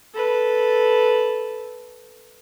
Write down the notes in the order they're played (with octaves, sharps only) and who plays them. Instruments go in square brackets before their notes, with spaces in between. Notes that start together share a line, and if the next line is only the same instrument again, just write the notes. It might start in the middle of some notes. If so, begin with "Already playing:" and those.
[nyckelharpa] A4 B4